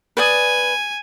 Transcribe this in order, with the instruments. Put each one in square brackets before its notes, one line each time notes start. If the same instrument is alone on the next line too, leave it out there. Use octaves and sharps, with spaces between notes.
[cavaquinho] B4 D5 D#6 [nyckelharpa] G#5